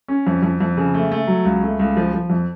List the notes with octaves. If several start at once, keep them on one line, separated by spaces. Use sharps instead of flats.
C#4
F2
F2
F2
C#3
A3
A3
F#3
C#2
A3
C#2
F3
F3
F2